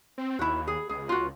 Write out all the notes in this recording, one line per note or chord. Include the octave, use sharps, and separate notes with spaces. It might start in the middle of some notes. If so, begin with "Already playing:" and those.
C4
D#2 E4 F#4
G#4
C#2 G#4
F4 F#4